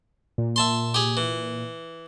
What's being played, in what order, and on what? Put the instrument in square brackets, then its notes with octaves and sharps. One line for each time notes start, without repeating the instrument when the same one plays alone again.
[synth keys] A#2
[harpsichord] E5 A5 C6
G4 G#4
E3